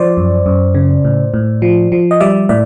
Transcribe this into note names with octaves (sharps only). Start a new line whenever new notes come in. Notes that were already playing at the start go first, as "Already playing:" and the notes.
Already playing: F3 C5 D5
F#2
F#2
C#3
A2
A2
F3
F3
D#5
G3 D5 E5
A2 D5 E5